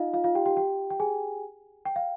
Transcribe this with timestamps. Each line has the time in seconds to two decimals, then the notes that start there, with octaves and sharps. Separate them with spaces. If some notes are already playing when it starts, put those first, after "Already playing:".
Already playing: D#4 F4 D#5 F5
0.13 F4 F5
0.24 F4 F5
0.35 G4 G5
0.46 G4 G5
0.57 G4 G5
0.90 G5
1.00 G#4 G#5
1.85 G5
1.96 F5